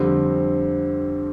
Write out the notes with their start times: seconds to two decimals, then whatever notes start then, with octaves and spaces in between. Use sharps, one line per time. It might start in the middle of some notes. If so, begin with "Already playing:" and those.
Already playing: F2 D3 G3 C4